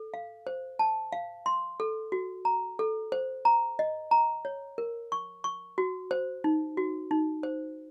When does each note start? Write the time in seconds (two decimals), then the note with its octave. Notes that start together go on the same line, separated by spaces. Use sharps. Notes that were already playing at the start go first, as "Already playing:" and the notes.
Already playing: A4
0.14 F5
0.47 C5
0.79 A5
1.12 F5
1.46 C6
1.80 A4
2.12 F#4
2.45 A#5
2.79 A4
3.12 C5
3.45 A#5
3.79 D#5
4.11 A#5
4.45 C#5
4.78 A#4
5.12 C#6
5.44 C#6
5.78 F#4
6.11 C5
6.44 D#4
6.77 F#4
7.11 D#4
7.43 C5